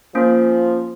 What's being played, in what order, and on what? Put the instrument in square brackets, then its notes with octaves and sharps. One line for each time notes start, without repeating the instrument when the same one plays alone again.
[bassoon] F3 [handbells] A#3 C#4